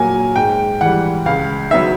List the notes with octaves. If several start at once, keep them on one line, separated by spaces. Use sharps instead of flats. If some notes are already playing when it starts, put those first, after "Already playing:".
Already playing: A#2 F#3 A#3 G#5
G#2 G5
E3 G3 F#5
C#2 F5
C#3 F#3 B3 D#4 E5